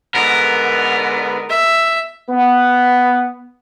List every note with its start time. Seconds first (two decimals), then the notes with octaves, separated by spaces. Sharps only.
0.15 G#2 D3 B3 A#4
1.49 E5
2.29 B3